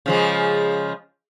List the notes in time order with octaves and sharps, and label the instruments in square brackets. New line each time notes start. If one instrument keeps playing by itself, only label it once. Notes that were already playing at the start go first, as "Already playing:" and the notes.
[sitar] C#3 F3 G#3